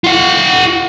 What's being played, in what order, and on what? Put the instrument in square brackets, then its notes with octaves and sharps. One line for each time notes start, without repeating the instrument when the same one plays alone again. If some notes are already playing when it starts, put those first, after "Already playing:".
[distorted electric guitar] F4 F#5